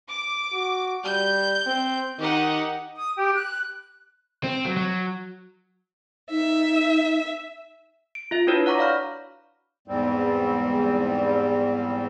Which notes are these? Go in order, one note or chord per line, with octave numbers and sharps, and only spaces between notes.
D6
F#4
G3 G6
C4
D#3 D#4 G4 F#5
D#6
G4
F#6
C4
F#3
F#3
D#4 E5
D7
F4 E5
D4 E4 F#4 B4 C#5
C#5 F#5 A#5 C#6 D6 A#6
D5 F5 B5 F6
E2 G#2 G3 C4